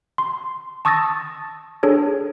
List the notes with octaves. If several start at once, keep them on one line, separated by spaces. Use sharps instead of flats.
C6
A5 C#6 D#6 E6 A6 A#6
D4 G#4 A4 C#5